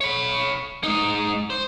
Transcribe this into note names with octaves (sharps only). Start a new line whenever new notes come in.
C#5 B5
G#3 D#4
C5